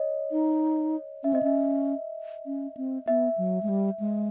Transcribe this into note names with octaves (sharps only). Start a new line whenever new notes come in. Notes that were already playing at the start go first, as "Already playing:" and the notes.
Already playing: C#5 D#5
D#4
C#4 E5
C4 D#5
C#4 E5
C#4
C4
B3 E5
F#3
G#3
G3
G#3